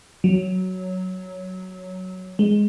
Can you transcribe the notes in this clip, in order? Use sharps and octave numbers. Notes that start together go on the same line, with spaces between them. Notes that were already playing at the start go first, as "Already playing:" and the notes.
F#3
G#3